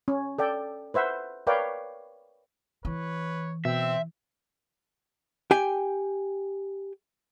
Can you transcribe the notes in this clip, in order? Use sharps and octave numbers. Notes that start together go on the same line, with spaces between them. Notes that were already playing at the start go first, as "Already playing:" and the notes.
C#4
A4 D5 G5
B4 C5 E5 F#5
A#4 B4 C#5 D5 F5 G5
E3 B4 C#5
B2 C4 E5
G4 G5 G#5